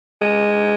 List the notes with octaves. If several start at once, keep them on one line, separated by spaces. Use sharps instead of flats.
G#3